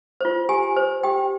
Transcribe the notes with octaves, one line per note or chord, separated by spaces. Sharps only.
F4 C5
G4 G#5
C5
G4 G5